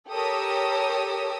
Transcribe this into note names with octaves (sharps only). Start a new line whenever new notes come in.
G4 A4 A#4 C#5 D#6 E6